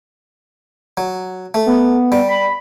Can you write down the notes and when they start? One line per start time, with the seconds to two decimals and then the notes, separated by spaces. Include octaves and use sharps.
0.97 F#3
1.54 A3
1.66 B3
2.12 G3
2.28 B5